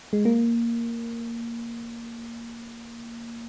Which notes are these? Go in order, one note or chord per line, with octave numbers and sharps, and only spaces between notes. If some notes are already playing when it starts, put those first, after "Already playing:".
G#3
A#3